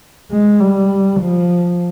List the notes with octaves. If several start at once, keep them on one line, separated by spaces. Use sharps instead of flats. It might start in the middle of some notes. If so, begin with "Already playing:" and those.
G#3
G3
F3